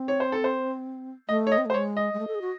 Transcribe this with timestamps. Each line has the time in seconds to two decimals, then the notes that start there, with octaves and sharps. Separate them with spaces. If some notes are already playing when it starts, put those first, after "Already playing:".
Already playing: C4
0.08 C#5
0.20 C5
0.32 A4
0.44 C5
1.29 A3 D#5
1.47 C#5
1.52 D#5
1.58 C4
1.65 A3
1.70 C5
1.74 G#3 C#5
1.97 D#5
2.14 G#3
2.19 A3
2.28 A4
2.35 G#4
2.41 F#4